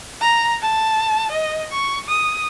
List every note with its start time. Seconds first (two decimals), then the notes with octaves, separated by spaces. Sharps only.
0.21 A#5
0.62 A5
1.31 D#5
1.72 C#6
2.08 D#6